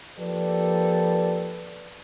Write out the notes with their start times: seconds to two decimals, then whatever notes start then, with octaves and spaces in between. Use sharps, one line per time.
0.19 F3 A#3 G4 A4 B4 D5